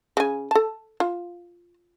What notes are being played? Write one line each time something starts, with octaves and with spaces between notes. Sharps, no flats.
C#3 G#5
A4 A5
F4